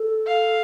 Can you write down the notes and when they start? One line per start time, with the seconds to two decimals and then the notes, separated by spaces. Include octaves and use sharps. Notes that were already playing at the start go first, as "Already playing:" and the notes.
Already playing: A4
0.27 F5